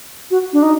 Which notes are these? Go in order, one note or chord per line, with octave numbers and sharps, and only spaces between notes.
F#4
D4
D#4